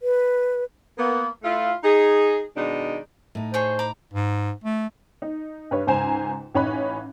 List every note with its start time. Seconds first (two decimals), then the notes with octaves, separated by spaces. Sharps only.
0.01 B4
0.98 A#3 B3
1.43 A3 E4 F4
1.83 D#4 G#4
2.56 B2 D#3 G#3 D4 D#4
3.35 A2 D#4
3.54 G#4 C5 C#5 C#6
3.79 A#5 B5 D6
4.14 G#2
4.64 A3
5.22 D#4
5.71 G2 B4 C#5
5.87 C#2 G#2 C5 G#5 A#5 E7
6.55 A1 C#4 D#4 B5 F#6